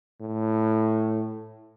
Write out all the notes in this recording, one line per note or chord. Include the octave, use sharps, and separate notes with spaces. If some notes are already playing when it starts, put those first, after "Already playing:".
A2